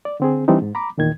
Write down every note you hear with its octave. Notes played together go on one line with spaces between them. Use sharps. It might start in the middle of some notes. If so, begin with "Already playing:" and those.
D5
D3 C4 G#4
E3 G3 C4 D4 D#4
G#2
A#5 B5 D6
E2 A#2 D#3 G#6